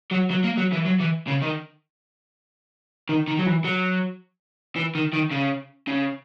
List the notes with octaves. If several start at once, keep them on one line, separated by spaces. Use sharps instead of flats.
F#3
F#3
A#3
F#3
E3
F#3
E3
C#3
D#3
D#3
D#3
F#3
E3
F#3
E3
D#3
D#3
C#3
C#3